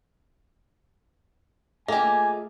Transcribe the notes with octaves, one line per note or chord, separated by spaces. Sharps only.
A3 A#3 F4 G4 G#4 D#5 G#5